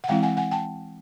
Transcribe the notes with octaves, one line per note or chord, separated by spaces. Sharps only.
F#5
E3 G#3 C4 E4 F5 G5
F#5 G#5
F#5 G#5
G5 A5